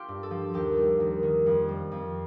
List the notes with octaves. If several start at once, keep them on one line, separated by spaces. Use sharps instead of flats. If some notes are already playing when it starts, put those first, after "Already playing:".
Already playing: F4 G4
G2
A4
F3
D#2 G4
G3
D#2
D#3
F2
G3
F2